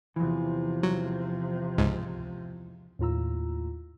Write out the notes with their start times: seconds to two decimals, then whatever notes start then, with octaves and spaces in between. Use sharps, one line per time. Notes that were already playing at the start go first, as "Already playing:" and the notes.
0.16 E2 C3 E3 F3
0.83 F#3
1.78 C#2 G#2
2.99 D#2 A2 F4 A#5 E6